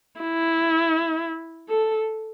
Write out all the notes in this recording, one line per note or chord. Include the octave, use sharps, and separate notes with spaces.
E4
A4